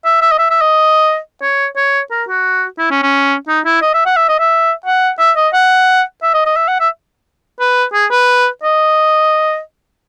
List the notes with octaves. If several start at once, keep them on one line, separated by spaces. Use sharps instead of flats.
E5
E5
D#5
E5
E5
D#5
C#5
C#5
A#4
F#4
E4
C#4
C#4
D#4
E4
D#5
E5
F#5
E5
D#5
E5
F#5
E5
D#5
F#5
E5
D#5
D#5
E5
F#5
E5
B4
G#4
B4
D#5